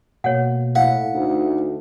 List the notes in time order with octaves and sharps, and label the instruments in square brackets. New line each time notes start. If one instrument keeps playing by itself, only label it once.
[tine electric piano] B2 A#3 [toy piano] C#5 F#5
[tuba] A2 [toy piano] F5 [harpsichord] F#5
[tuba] D2 [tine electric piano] D#4